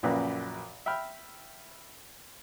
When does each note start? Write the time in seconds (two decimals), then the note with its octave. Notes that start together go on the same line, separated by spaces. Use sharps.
0.03 A#1 F#2 A#2 C#3 B4 D6
0.86 E5 G5 B5 F6